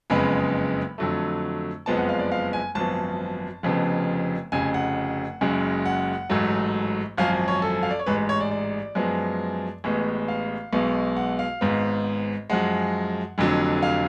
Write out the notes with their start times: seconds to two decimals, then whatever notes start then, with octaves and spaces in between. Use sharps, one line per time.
0.10 F#1 F2 C#3 G#3 B3 B5
0.98 F2 D3 F#3 A3
1.86 F#1 F2 F3 G#3 B3 A5
1.97 F#5
2.09 F5
2.19 D5
2.32 F5
2.53 G#5
2.75 G#1 F#2 F3 B3 A5
3.63 F1 F2 C#3 F3 B3
4.52 F1 F2 C#3 G#5
4.74 F#5
5.41 F#1 F#2 C#3 G#3
5.86 F#5
6.29 A1 G#2 F#3 A3
7.18 G#1 F#2 F3 F5
7.48 C#5
7.62 A4
7.83 F5
7.91 D5
7.99 C#5
8.06 A1 G#2 G#3 B4
8.18 B4
8.29 C#5
8.40 D5
8.51 D5
8.95 F#2 F3 G#3 B3
9.84 A1 A2 G#3 B3
10.28 F5
10.73 B1 B2 G#3 B3
11.17 F#5
11.39 F5
11.61 G#1 G#2 G#3 B3
12.50 F#2 F3 G#3 F#5
13.38 F1 F2 D3 F#3
13.83 F5